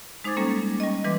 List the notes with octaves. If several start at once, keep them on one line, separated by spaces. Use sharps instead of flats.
G#3 D#4 C5 D6 G#6 A6
G3 A#3 C#4 A4
G3 C#4 D#5
E3 G3 B4 D#5 C6 D6